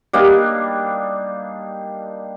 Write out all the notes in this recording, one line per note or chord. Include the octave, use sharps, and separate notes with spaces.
G3 A#3 D4 D#4